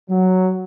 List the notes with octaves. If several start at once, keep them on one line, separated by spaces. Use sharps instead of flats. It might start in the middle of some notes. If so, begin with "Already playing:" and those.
F#3